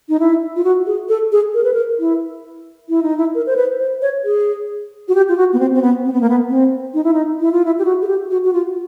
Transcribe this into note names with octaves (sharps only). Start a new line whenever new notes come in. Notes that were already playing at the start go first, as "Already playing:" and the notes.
D#4
E4
F4
F#4
G#4
A4
G#4
A#4
B4
A#4
E4
E4
D#4
E4
A#4
C5
B4
C5
C#5
G#4
F#4
G4
F4
F#4
B3
C4
C4
B3
C4
B3
A#3
B3
C4
D#4
E4
D#4
E4
F4
E4
G4
F#4
G#4
G4
F#4
F#4
F4